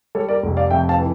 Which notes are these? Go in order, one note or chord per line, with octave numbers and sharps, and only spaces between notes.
G3 A4 C#5
A#4 D5
F1
D5 F5
F2 E5 G5
F5 A5
E3